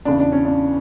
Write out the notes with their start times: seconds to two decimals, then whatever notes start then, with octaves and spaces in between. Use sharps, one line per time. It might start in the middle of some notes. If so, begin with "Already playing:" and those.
0.05 E2 C#3 E3 D4
0.20 D4
0.32 C#4
0.45 D4